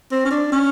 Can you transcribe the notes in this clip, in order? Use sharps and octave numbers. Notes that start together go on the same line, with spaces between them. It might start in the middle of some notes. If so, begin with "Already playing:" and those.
C4
C#4
D4
C#4